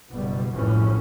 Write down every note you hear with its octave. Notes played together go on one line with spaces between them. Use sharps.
F#1 B2 G3
F1 A#1 F#2 A2 E3 C#4